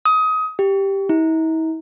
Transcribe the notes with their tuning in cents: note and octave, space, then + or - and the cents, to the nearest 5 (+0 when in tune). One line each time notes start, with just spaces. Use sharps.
D#6 +25
G4 +0
E4 -45